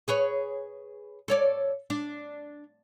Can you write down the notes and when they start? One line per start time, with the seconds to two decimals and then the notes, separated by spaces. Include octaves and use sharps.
0.08 G#4 B4 C#5
1.28 A4 C#5 D5
1.90 D4